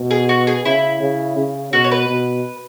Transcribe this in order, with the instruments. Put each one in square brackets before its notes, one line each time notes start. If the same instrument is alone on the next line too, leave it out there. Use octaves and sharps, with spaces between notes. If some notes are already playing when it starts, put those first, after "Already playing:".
Already playing: [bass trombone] B2
[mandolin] G#4
F#4
G#4
[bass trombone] C#3 [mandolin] E4
[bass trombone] C#3
C#3
[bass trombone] B2 [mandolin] F#4
[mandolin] C#5
B4
[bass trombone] B2